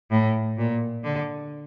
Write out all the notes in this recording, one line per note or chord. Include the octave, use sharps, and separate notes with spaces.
A2
A#2
D3